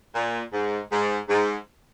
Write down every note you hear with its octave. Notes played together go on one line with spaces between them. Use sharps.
A#2
G#2
G#2
G#2